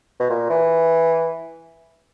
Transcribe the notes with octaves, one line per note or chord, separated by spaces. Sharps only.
B2
A#2
E3